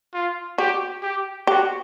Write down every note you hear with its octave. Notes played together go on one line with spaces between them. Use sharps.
F4
F#4 G4
G4
F#4 G4